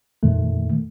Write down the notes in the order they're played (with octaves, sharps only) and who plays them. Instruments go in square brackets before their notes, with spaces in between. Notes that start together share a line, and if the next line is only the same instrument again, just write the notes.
[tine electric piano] F2 A#2 D#3 A3